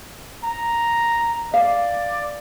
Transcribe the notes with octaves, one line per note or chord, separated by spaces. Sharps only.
A#5
D5 F5